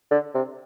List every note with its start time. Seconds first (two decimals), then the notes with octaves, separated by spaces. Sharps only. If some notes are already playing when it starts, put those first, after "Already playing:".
0.11 D3
0.34 C3